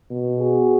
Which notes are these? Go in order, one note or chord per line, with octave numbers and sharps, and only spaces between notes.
B2
F#4 G#4